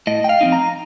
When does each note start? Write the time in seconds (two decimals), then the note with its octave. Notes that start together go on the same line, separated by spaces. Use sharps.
0.07 A2 D#5
0.24 G5
0.29 F5
0.41 F3 C4 D#4
0.52 A#5